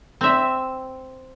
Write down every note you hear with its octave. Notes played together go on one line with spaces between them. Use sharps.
C4 E5